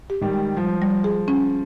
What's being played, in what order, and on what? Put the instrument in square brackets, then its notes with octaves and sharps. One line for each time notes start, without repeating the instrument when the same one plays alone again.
[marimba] G4
[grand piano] D#3 G3
[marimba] G#3
[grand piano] F3 [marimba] G3
[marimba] G3
G#4
C#4